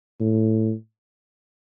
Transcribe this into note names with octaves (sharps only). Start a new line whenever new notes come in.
A2